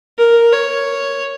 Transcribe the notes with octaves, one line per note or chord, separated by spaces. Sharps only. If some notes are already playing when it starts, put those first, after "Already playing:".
A#4
C#5